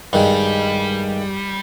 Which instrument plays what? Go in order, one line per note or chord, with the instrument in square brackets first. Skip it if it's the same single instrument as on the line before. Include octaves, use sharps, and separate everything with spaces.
[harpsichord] G2 D#3 G#3 [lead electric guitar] G3